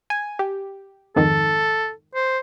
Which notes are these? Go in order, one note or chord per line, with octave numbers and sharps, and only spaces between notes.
G#5
G4
F2 G#2 D#3 A4
C5